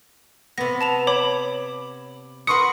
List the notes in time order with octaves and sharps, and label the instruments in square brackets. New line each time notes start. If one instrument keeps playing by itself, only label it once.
[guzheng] C3 B3 [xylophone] A#6
[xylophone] A5 E7 F7
[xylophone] C#5 B5 [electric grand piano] D6
[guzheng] F#4 A#4 B4 [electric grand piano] C6 C#6 C#7 [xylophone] D#6